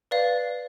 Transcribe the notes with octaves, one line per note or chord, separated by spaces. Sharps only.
B4 D5 F5